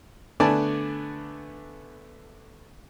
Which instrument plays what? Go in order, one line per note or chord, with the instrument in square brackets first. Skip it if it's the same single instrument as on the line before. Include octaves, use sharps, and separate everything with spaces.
[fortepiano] D3 A3 B3 D5 G#5 A5